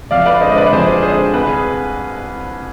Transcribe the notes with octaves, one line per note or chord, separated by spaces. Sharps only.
F2 D5 F5
B4 D5
D3 G#3 C5 D#5
D#5
B4 D5
F2 G#4 C5
D3 G#3 G#4 C5
C2 B4
G#4